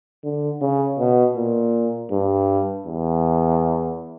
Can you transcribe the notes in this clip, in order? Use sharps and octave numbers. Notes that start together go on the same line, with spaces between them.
D3
C#3
B2
A#2
G2
E2